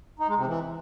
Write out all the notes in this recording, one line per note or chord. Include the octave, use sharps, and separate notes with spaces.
D#4
G#3
C3
E3